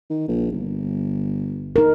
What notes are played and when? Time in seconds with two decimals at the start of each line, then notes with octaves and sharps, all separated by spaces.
0.10 D#3
0.28 A#1
0.52 G1
1.76 D#4 A#4